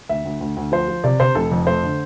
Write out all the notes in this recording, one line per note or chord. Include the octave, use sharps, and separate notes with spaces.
D2 E5
D2
D2
D2
F3 C5
F3
C3 D5
C3 C5
F1 A4
F2
A3 C5
D3